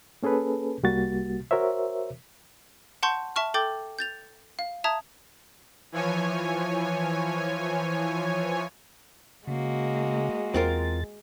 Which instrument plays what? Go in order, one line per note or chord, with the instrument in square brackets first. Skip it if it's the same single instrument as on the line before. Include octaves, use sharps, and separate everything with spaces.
[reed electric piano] A#3 C#4 G#4 A4 B4
C2 G3 A#3 F#4 A6
F#4 A#4 C5 C#5 E5
[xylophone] F#5 A5 C6 C#6 G6
E5 A5 C#6 F6
A4 G5 D6 G6 A6 G7
G6 A6 F7
F5
E5 A5 A#5 D#6 G#6
[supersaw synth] E3 F3 C#5 G#5
[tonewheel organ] C#3 [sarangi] G#3 [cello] A#3 F#4
[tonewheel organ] E2 A6 [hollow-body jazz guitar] C4 F4 A#4